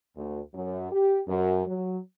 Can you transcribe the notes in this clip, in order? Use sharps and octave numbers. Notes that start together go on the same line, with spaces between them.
D2
F#2
G4
F#2
F#3